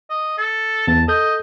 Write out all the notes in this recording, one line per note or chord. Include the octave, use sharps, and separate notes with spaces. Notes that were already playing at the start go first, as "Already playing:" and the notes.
D#5
A4
E2 A5
A4 D#5 G6